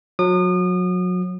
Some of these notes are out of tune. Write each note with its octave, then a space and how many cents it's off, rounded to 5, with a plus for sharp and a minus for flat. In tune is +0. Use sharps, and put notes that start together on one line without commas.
F#3 -30 D#6 -35